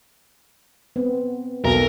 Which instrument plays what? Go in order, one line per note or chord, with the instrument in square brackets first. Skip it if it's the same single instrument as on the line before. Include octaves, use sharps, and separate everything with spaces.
[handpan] B3 C4
[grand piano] B1 [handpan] F#4 A4 [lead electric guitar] A#4